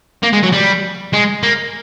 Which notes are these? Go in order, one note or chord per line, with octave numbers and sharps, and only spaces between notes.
A#3
G#3
F#3
G3
G#3
A#3